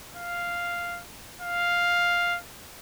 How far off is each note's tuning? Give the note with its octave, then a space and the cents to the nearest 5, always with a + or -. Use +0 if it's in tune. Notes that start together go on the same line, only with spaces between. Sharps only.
F5 -5
F5 +5